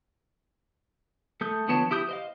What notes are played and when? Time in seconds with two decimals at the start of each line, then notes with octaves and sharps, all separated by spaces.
1.41 A3 A4 D#6 G6
1.68 D3 F3 B3 C#5 A5
1.91 E4 G4 D#6 G6
2.09 C5 D#5 F5